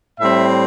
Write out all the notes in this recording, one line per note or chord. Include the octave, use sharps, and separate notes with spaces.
A2 G3 C4 E5